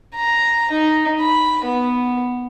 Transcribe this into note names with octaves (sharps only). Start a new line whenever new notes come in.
A#5
D#4
B5
B3